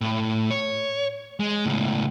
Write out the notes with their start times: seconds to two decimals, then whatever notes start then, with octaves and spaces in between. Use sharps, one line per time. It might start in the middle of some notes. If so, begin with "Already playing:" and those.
0.01 A2
0.50 C#5
1.40 G#3
1.66 C#2 A2